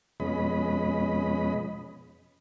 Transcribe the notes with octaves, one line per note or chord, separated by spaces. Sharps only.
F2 B2 G#3 C#4 D#5 B5